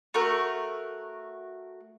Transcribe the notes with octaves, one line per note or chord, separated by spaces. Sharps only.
A3 F#4 A#4